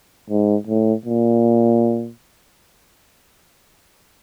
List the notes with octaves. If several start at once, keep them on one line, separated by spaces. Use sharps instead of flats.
G#2
A2
A#2